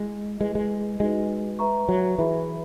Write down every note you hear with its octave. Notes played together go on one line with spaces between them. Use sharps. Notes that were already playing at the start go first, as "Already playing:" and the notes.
Already playing: G#3 E4 G#4 D#5
G#3 E4 B4 D#5
G#3
G#3 D#4 F#4 B4
B4 E5 A#5 C#6
F#3
E3 G#4 B4 E5 B5